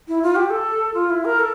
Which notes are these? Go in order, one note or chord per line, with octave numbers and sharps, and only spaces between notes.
E4
F4
G4
A4
F4
E4
A#4
A4